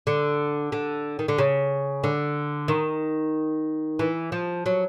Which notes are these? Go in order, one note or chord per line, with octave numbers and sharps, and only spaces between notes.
D3
D3
D#3
D3
C#3
D3
D#3
E3
F3
F#3